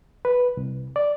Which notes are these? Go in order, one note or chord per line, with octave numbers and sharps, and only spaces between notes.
B4
C2
D5